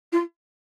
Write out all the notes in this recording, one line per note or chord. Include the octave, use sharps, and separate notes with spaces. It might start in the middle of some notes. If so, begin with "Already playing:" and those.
F4